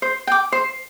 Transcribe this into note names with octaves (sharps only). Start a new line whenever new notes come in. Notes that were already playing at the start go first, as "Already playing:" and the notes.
C5
G5 D6
C5